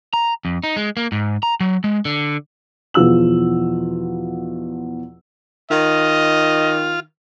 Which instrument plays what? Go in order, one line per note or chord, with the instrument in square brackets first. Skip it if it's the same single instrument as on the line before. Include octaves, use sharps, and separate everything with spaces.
[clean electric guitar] A#5
F2
D#4
G#3
A#3
G#2
A#5
F#3
G#3
D3
[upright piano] E2 B2 F3 F4 E6 F#7
[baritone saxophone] D#3 [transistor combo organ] F4 [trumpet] D#5